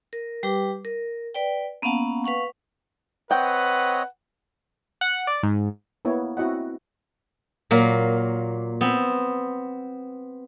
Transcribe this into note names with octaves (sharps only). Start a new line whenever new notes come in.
A#4
G3 G4 B4 G5 D6
A#4
B4 D5 G5
A#3 B3 C#4 F5 F#5 A5
B4 F5 F#5 C#6
C4 B4 C#5 D#5 F#5 G5
F#5
D5
G#2
A#3 B3 E4 C#5
C4 E4 F#4 D#5 F#5
A#2 F#3 A#3
B3 C4